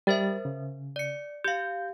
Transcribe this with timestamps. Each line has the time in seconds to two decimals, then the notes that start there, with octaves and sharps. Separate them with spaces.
0.07 G3 A#4 C5 E5 A6
0.45 C#3
0.96 D5 C#7
1.44 G4 F5 G6